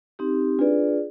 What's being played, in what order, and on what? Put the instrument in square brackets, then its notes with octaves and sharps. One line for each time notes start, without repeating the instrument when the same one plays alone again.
[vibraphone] C4 D#4 G4
[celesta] D4 B4 [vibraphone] F4 G#4 D5